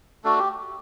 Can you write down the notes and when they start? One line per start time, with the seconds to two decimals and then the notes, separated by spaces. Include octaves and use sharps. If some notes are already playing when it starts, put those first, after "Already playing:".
0.24 A3 D4 F#4 A4
0.39 G4